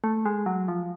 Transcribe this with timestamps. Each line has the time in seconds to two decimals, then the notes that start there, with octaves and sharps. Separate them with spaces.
0.04 A3
0.25 G#3
0.46 F#3
0.68 F3